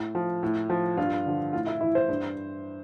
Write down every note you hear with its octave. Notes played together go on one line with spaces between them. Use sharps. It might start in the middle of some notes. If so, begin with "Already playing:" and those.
Already playing: A2
F3
A2
F3
G2 F4
D3 F3
A2 F4
E4
E3 E4
C5
G2